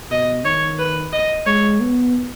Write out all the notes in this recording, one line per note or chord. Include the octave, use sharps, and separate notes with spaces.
B2 D#5
D#3 C#5
B4
D#5
G#3 C#5
B3